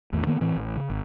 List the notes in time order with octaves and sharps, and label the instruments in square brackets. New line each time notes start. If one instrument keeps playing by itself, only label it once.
[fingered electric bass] A1 E2 D#3 A3
D#3 A#3 B3
A2 E3 C4
A1
C#3
G#1